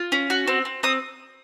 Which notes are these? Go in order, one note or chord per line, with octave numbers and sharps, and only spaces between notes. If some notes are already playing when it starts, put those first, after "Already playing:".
Already playing: F4
C#4
F#4
C4
C4
C4 D#6